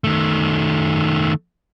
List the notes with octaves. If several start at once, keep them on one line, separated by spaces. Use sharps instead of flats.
D#3 A3